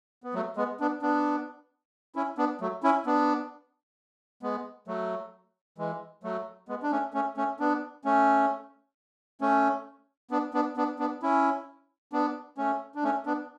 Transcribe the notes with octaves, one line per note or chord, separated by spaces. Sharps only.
B3
F#3 A3
G#3 B3
B3 D4
B3 D4
C#4 E4
B3 D4
F#3 A3
C#4 E4
B3 D4
G#3 B3
F#3 A3
E3 G#3
F#3 A3
G#3 B3
D4
A3 C#4
A3 C#4
A3 C#4
B3 D4
A3 C#4
A3 C#4
B3 D4
B3 D4
B3 D4
B3 D4
C#4 E4
B3 D4
A3 C#4
D4
A3 C#4
B3 D4